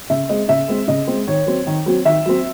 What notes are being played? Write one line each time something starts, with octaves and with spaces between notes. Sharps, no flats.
C#3 E5
G#3 C4 D#5
C#3 E5
G#3 C4
C#3 D#5
G#3 C4
D#3 C#5
F#3 C4
D#3
F#3 C4
D#3 E5
F#3 C4